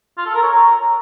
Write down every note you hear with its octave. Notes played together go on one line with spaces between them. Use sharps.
F4
A4
A#4
C#5
A#5